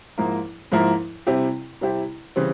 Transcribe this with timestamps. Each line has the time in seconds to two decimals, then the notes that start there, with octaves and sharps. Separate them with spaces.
0.18 G#2 F3 A#3 E4 A#4
0.72 G#2 F3 A#3 E4 A#4
1.27 C3 G3 C4 E4 G4
1.81 C3 G3 C4 E4 G4
2.36 C#3 E3 G3 C4